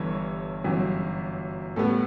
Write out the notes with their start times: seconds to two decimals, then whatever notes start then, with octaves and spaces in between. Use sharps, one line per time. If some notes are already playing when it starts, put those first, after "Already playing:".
Already playing: G1 G2 E3 C#5
0.64 G1 F#2 E3
1.76 A2 G3 B3 A4